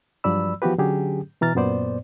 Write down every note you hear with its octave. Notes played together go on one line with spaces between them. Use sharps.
G2 F3 F#3 D5 B5 E6
E3 F3 B3 F#4 G4 B4
D3 F#3 C#4 G4 G#4
B2 E3 A#5 F6 A6
F#2 A#2 B3 C5 D5